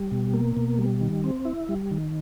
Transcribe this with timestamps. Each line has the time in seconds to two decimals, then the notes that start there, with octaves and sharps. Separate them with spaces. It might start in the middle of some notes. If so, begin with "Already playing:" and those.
Already playing: G3
0.12 B2
0.34 A#3
0.57 B2
0.79 G3
1.01 D#3
1.24 C4
1.45 E4
1.69 G3
1.91 D#3